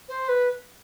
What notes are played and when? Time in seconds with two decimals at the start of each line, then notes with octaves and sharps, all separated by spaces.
0.09 C5
0.28 B4